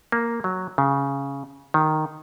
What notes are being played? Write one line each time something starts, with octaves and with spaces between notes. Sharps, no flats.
A#3
F#3
C#3
D#3